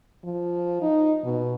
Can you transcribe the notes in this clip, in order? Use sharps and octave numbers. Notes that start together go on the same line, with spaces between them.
F3
D#4
B2